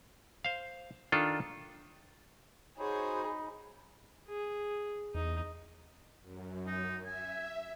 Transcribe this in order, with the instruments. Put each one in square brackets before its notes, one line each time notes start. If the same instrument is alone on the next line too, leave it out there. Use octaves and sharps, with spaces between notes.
[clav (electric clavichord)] C5 F5
D#3 D4 F4 A4
[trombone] D#4 [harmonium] F#4 C5 C#5 [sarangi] G#4 [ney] B5
[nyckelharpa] G#4
[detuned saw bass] E2 [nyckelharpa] D#4
[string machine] F#2
[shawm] D#4
[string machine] E5 [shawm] G#5